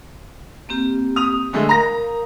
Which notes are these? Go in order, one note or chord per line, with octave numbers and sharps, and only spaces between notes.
A#3 C4 G4
D#6 F7
D3 G#3 A3
A#4 F5 A#5 A#6